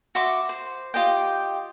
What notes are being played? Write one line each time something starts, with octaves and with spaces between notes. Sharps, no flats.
F#4 E5 C6 D6
C5
F4 G4 D#5 G5